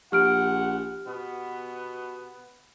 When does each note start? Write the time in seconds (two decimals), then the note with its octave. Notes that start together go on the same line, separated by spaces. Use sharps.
0.12 A#1 G4 F#5 F6 D7
1.07 B2 B3